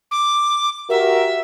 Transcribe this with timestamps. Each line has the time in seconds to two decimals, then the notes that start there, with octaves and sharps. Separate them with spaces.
0.11 D6
0.90 F#4 G4 A#4 E5